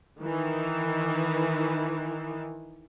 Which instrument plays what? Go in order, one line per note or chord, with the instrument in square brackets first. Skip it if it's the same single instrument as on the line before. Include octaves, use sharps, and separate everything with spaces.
[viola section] D#3 E3